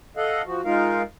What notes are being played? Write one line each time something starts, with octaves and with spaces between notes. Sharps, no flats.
A4 D#5 F5 F#5
F3 F#4
G#3 D#4 F4 A#4 F5